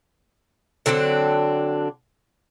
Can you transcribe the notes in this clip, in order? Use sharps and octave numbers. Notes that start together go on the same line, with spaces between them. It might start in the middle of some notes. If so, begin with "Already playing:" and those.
D3 F#3 C4 D4